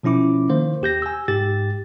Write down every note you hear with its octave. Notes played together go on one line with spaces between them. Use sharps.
B2 F3 C#4 E4 D6
D#3 A#3 C5
D#2 G4 G6 A#6
G#5 E6
G#2 G4 A6